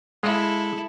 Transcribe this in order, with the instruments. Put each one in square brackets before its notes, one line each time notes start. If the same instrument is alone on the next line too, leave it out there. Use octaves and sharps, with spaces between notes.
[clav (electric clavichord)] G#3 F5 [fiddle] E4 A4